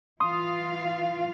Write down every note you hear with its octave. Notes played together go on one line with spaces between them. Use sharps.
E3 F4 F5 C6 D#6